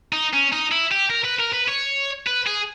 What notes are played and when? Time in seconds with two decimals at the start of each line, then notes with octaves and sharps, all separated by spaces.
0.13 D#4
0.33 C#4
0.52 D#4
0.71 E4
0.91 G4
1.10 A#4
1.25 B4
1.40 A#4
1.54 B4
1.69 C#5
2.27 B4
2.46 G#4